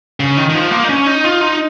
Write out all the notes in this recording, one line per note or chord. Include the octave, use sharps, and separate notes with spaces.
C#3
D#3
D#3
F3
A#3
D#4
C#4
D#4
F4
D#4